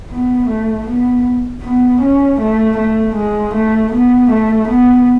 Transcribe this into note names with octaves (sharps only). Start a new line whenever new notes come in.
B3
A3
B3
B3
C#4
A3
A3
G#3
A3
B3
A3
B3